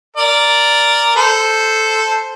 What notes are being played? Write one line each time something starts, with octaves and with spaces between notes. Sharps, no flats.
A#4 D5
A4 C5